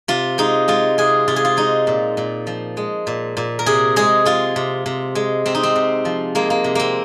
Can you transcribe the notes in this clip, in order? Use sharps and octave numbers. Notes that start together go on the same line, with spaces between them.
C3 F4
G#3 D#4
G#3 F4
C3 G#4
C3 F4
G#4
F4
G#3 D#4
A#2
A#2
F3
G#3
A#2
A#2
A#4
C3 G#4
G#3 G#4
G#3 F4
C3
C3
G#3
C3 C4
D#4
C4
C3
F3
G#3 A#3
A#3
C3
A#3 C4